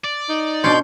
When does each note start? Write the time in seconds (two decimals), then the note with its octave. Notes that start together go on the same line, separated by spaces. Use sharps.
0.04 D5
0.29 D#4
0.64 B2 C#4 D4 C6 G6